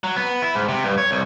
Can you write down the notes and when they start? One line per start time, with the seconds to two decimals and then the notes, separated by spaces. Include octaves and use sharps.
0.04 F#3
0.16 B3
0.42 E4
0.55 G#2
0.69 C3
0.84 G2
0.98 C#5
1.11 C2